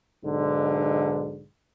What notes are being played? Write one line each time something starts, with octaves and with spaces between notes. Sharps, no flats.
B1 G#2 D3